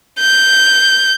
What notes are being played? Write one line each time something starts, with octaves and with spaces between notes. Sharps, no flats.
G6